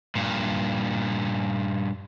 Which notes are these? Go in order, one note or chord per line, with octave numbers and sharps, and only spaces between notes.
G2 A#2